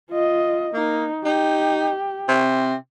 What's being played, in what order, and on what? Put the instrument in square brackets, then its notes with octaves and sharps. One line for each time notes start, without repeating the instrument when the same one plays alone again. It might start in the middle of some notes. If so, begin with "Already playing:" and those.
[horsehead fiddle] F4 D#5
[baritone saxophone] A#3 [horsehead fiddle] D#4
[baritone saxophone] D#4 [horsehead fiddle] G4
[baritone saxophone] C3